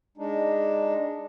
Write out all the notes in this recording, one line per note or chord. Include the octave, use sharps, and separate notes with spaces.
G#3 D4 D#4